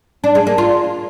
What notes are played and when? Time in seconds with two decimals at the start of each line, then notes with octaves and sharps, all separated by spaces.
0.24 D4
0.35 G#3
0.47 A#3
0.58 F4